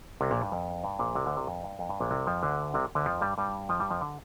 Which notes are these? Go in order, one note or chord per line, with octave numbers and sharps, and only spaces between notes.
C2 C3
A#1 A#2
G2
F2
G2
A#1 A#2
C2 C3
D2 D3
C2 C3
F2
G2
F2
G2
A#1 A#2
C2 C3
F2 F3
D2 D3
C2 C3
D2 D3
F2 F3
G2 G3
G2 G3
F2 F3
G2 G3
F2 F3
D3